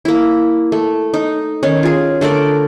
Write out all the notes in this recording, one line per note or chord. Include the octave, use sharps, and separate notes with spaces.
A#3 E4
A3
D#4
D#3 C#4
F4 G#4
D3 A3 A#4 D5